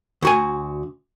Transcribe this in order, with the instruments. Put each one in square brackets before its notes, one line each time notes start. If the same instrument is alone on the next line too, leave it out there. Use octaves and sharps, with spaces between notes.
[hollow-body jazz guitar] D2 F#4 G#5